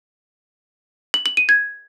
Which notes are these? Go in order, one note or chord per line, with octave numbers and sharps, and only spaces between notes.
F#7
F#7
D#7
G#6